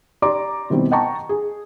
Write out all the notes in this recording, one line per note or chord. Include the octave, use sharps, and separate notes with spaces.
G4 D5 A#5 C6 D6
B2 D#3 G3 C4 E4
D#5 F#5 G5 A5 A#5 C#6
G#4